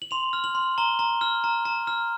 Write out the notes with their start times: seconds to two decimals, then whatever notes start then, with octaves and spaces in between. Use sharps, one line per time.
0.02 F#7
0.11 C6 F7
0.33 F6
0.44 F#7
0.55 C6
0.78 A#5 G7
0.99 A#5
1.21 F6
1.44 A#5
1.65 A#5
1.87 F6